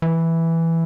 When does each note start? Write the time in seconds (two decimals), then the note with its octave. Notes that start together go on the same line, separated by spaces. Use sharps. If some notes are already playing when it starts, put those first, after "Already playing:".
0.02 E3